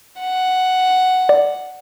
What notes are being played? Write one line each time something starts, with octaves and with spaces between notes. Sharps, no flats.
F#5
D5